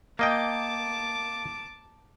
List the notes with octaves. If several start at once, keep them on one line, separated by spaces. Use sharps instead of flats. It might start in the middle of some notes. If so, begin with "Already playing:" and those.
A#3 D#5 G5 A5 D6